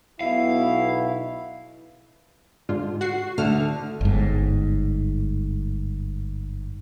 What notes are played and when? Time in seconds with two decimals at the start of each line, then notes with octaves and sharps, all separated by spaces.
0.21 B1 B2 E4 F5
2.69 G#2 D3 F4
3.01 F#4 C7
3.38 D2 D3 F6
4.01 G1 G#2